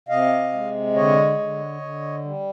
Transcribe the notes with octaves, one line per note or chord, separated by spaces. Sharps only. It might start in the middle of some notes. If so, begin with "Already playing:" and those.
C3 D#5 F5
G#3
D3 C#5 D#5
D3
D3
G3